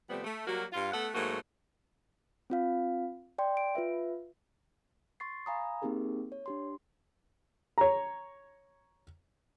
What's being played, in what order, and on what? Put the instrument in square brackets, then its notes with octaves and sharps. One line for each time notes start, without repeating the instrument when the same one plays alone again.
[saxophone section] C3 F3 G3 A3 B3
A3
F#3 G3 A#3 F#4 A#4
G2 F4
A3 B3 A4 F#5
G#2 F#3 A3 A#3 F#4
[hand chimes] C4 F4 F5
D5 G5 C6
D7
F4 B4 E5
C6 C#6 A6 C7
F5 G#5 A#5 B5 D#6
A#3 C4 D#4 G4 G#4 A#4
C#5
D4 G4 C6
[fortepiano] C#5 A#5